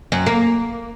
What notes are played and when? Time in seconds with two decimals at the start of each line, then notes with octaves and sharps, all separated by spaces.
0.12 F#2
0.26 A#3